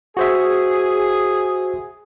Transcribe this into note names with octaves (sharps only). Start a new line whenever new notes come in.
F#4 G#4 C5 E5